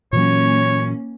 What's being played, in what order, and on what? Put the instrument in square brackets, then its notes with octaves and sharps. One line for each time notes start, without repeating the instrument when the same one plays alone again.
[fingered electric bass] A#2 E3 F#3 [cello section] A#3 C#4 [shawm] C#5